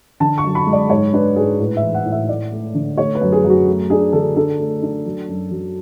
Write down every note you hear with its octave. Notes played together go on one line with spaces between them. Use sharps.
D3 A5
C#6
F#2
B5
G#3
D5
G#2 C#5
D4 B4
G#2 G#4
A2 B4
E5
E3
F#5
A2
E5
A3 D5
A3
D3
A3 C#5
B4
F#2
G#4
F#2
F#4
A3
D4 G#4
D3 A4
D4 A4
A3
D4
F#3
F#2
F#3